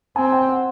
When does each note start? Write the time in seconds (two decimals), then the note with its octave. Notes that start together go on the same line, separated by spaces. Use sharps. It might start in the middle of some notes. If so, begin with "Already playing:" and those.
0.16 C4 G#5
0.32 G5
0.49 F#5